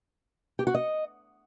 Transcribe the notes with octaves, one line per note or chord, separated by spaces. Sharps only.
G4
F#4
D#5